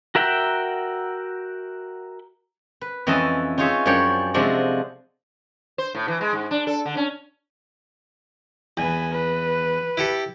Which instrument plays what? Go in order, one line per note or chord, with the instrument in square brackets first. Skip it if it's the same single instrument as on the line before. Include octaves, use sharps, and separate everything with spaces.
[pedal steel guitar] F#4 A#4 E5 F#5 G5
[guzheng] B4
F2 E3 C#4 D#5 A5
C#4 D#4 F4 G#4 C#5 E5
F#2 F3 D4 C#5 G5
C3 F3 G#3 D4 F#4 A4
[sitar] C5
A2
E3
G#3
G#2
D4
A4
D3
C#4
[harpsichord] E2 [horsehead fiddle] B4 G#5
[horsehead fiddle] B4
[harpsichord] E4 G4 A4